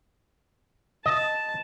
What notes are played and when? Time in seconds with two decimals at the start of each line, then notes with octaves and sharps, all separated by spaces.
1.06 D#5 A5